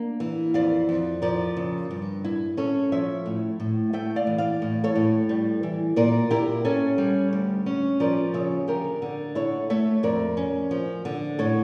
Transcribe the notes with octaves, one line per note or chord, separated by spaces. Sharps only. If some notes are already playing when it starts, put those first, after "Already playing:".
Already playing: A#3 D4
E3
F2 D5 F5
F2
F3 A#4 D5
C#3
G2
E4
C#4 A4 C#5
F3 C#5 E5
A2
A2
A3 E5 G5
D5 F5
E3
D5 F5
A2
A4 C#5
A2
G3
E3
A#2 A#4 D5
E4 G4 A#4
C#4 A4 C#5
G3
D2
C#4
F3 A#4 D5
C#3 C#5 E5
D3 G4 A#4
D3
E4 A4 C#5
A3 C#5 E5
F2 A#4 D5
C#4
F3
D3
A2 A4 C#5